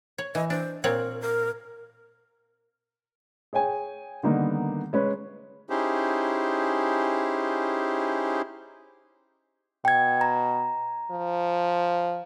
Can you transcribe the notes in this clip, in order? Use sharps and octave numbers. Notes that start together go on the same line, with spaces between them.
C#5
E3 D#5
D4 C5
A#2 C4 A#4 C#5
A#4
G#4 C#5 G5 G#5
D3 D#3 G3 A#3 B3 D#4
G#3 C#4 B4
C#4 D#4 E4 G4 G#4 C5
B2 G5 G#6
A#5
F3